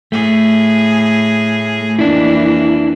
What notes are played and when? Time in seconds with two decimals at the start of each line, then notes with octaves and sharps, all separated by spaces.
0.12 A2 A3 G#4
1.99 F2 E3 A#3 D4 E4